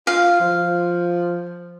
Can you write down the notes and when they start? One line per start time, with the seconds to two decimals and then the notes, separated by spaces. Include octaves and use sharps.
0.07 F4 F5
0.40 F3